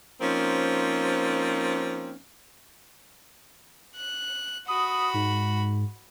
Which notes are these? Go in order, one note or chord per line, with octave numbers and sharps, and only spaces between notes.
F3 A#3 C4 C#4 D#4
F#6
F#4 B5 D#6
G#2